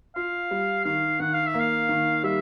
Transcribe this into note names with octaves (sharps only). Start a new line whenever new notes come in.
F4 F5
G3
D#3 F5
D#3 F#5
F5
E5
A#3
F5
D#3
G3 E5